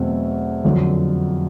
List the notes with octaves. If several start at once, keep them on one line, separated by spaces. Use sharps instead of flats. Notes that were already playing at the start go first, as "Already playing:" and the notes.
Already playing: E2 B2 F#3 A3 C4
F2 D3 F#3